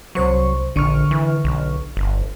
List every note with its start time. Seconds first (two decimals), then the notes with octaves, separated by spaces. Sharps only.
0.15 C2 F#3 C5 C#6
0.76 A#1 D3 C#6 F6
1.11 E3
1.44 B1
1.97 G1